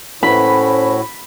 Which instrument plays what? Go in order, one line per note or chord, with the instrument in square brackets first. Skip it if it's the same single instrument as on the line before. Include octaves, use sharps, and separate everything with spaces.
[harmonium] A2 E4 F#4 [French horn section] C#4 A4 C5 [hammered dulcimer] B5